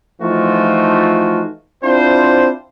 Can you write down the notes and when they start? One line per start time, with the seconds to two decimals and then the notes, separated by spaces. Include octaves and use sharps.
0.21 E3 F3 A3 D#4 F4 F#4
1.83 C4 D4 E4 F4 C5